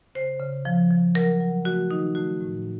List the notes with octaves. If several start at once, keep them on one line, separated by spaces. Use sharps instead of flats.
C#3 C5
C#3
F3
F3
F#3 A#4
F#3
A3 F#4
D#3 D#4
A3 F#4
A2